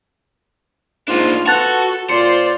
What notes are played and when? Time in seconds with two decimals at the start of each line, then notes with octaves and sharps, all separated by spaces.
1.08 G#2 A#3 D4 F4
1.46 F#4 A4 B4 F#5 A5 F#6 A6 F7
2.09 A#2 F4 C5 D5 C#7